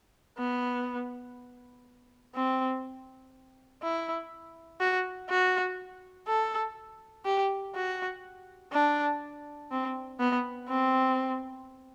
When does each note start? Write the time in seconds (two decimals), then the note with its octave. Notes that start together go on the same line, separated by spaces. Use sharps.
0.38 B3
2.35 C4
3.82 E4
4.80 F#4
5.29 F#4
6.27 A4
7.25 G4
7.75 F#4
8.73 D4
9.71 C4
10.20 B3
10.69 C4